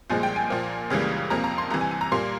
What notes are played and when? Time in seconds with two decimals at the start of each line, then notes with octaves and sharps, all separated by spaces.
0.10 C2 A#2 F3 G#3 G#5
0.23 G5
0.36 G#5
0.50 A#2 F3 A#3
0.90 C#2 C#3 E3 G3 A#3
1.30 F2 C3 F3 A#3 A#5
1.44 A#5
1.58 C6
1.71 C2 C3 E3 A#5
1.81 G#5
1.91 G#5
2.01 A#5
2.12 A#2 G3 A#3 C6